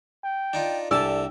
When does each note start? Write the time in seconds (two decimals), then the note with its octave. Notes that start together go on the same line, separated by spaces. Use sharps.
0.24 G5
0.53 D4 D#4 F4
0.91 C2 C3 D4 G4 A4 D5 A5 E6